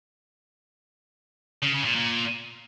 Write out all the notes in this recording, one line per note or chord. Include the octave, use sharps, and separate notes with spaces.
C#3
C#3
A#2
A#2